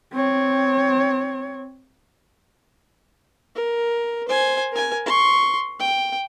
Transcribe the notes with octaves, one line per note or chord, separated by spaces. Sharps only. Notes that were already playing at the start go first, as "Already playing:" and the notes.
C4 C#5
A#4
C5 G#5
A#4 G#5
C6 C#6
G5